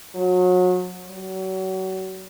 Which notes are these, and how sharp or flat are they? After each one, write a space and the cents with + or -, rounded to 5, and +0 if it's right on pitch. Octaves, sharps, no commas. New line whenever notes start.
F#3 -30
F#3 +35